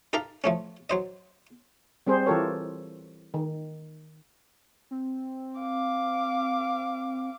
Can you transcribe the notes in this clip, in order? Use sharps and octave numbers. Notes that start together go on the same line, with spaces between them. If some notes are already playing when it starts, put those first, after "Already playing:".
D#4 G4 A4 A#4 F5 A#5
F3 A3 C#4
F#3 C5 D#5
G3 C4 G#4 C5
E3 F4 G4 A4 A#4 C#5
D#3
C4
F5 D6